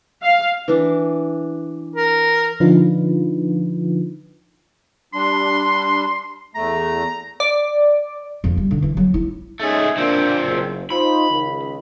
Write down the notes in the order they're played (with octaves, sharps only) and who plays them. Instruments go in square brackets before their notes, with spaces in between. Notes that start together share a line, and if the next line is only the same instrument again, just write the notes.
[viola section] F5
[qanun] E3 D4
[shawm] A#4
[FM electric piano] D3 F3 D4 D#4 F4 B4
[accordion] G3 D4 [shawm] C6
[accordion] E2 A3 [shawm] A#5
[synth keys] D5
[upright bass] F2
G3
D3
E3
F#3
E4
[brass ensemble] G#3 C#4 D#4 [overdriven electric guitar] A3 G#4
[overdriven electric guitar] A#2 C4 [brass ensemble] A#3 D4
[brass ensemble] F#1
[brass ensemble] D#4 F4 C5 [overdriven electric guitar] B5
[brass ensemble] C#2 D#3